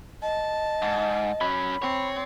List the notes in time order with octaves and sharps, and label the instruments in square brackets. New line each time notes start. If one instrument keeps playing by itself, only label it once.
[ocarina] D#5 [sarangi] A5
[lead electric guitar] G#2
[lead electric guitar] F#3 C#4 [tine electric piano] B5
[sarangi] C4 [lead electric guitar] C#5